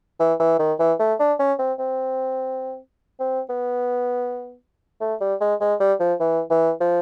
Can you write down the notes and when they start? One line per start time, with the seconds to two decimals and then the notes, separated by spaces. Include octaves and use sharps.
0.20 E3
0.39 E3
0.59 D#3
0.79 E3
0.99 A3
1.20 D4
1.39 C#4
1.59 C4
1.79 C4
3.20 C4
3.49 B3
5.01 A3
5.21 G3
5.41 G#3
5.61 G#3
5.80 G3
6.00 F3
6.20 E3
6.50 E3
6.80 F3